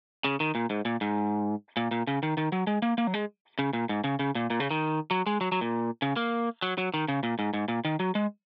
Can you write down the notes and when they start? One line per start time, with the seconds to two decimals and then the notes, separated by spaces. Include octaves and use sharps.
0.24 C#3
0.40 D#3
0.55 A#2
0.70 G#2
0.85 A#2
1.01 G#2
1.77 A#2
1.91 A#2
2.07 C#3
2.23 D#3
2.37 D#3
2.52 F#3
2.67 G#3
2.82 A#3
2.98 A#3
3.07 F#3
3.14 G#3
3.59 C#3
3.73 A#2
3.89 G#2
4.04 C#3
4.19 C#3
4.35 A#2
4.50 A#2
4.60 C#3
4.71 D#3
5.11 F#3
5.26 G#3
5.41 F#3
5.52 F#3
5.61 A#2
6.02 C#3
6.17 A#3
6.62 F#3
6.78 F#3
6.94 D#3
7.08 C#3
7.23 A#2
7.39 G#2
7.53 G#2
7.68 A#2
7.85 D#3
8.00 F#3
8.15 G#3